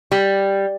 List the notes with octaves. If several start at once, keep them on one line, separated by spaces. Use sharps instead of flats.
G3